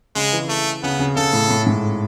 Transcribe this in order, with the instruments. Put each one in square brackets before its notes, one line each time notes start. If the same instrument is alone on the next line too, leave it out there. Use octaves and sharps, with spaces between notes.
[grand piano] C#3 [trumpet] G#3
[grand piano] E3
[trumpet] A3
[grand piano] C#3 [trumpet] B3
[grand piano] C#3
[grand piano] C#3 [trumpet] A4
[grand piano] A2
A2
G#2